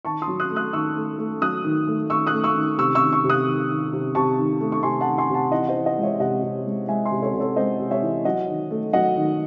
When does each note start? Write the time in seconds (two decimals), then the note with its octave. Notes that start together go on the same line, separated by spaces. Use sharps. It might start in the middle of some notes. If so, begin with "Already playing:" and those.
0.05 D#3 A5 C#6
0.22 C6 D#6
0.28 F#3
0.40 D#6 F#6
0.50 A3
0.56 D#6 F#6
0.73 D#3 C#6 E6
0.96 A3
1.19 A3
1.41 F#3 D#6 F#6
1.64 D#3
1.87 A3
2.10 D#3 C#6 E6
2.26 D#6 F#6
2.33 A3
2.44 C#6 E6
2.55 D#3
2.78 C3 C#6 E6
2.95 C#6 E6
3.01 D#3
3.13 C#6 E6
3.24 C3
3.30 D#6 F#6
3.47 D#3
3.69 D#3
3.92 C3
4.15 C3 A5 C#6
4.38 D#3
4.61 A3
4.72 C#6
4.83 C3 G#5 C6
5.01 F#5 A5
5.06 D#3
5.18 G#5 C6
5.29 C3
5.34 F#5 A5
5.52 E3 D#5 F#5
5.69 C5 D#5
5.74 E3
5.86 D#5 F#5
5.98 G#3
6.03 C#5 E5
6.20 C3 D#5 F#5
6.43 C3
6.66 G#3
6.88 G#3 E5 G#5
7.06 G#5 C6
7.11 C3
7.22 A4 C#5
7.34 C3
7.40 A4 C#5
7.56 G#3 C5 D#5
7.80 C3
7.91 C#5 E5
8.02 E3
8.25 F#3 D#5 F#5
8.48 D#3
8.71 A3
8.93 F#3 D#5 F#5
9.16 D#3